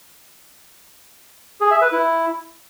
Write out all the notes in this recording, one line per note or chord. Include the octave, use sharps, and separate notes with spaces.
G#4
E5
B4
E4